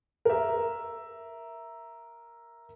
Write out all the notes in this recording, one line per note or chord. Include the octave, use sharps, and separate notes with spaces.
A#4 E5